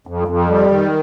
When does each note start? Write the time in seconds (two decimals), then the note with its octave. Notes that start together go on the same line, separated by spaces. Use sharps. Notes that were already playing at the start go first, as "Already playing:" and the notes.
0.07 F2
0.28 F2
0.49 G3
0.70 D#3